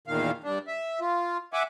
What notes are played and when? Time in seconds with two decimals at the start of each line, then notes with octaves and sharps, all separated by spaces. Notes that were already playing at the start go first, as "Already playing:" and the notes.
0.08 E2 A#2 D#3 F5
0.44 G2 D4
0.67 E5
1.01 F4
1.53 E5 F#5 G#5 D6